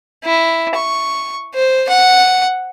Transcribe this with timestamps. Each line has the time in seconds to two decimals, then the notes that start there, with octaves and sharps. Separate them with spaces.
0.24 E4
0.75 C#6
1.54 C5
1.89 F#5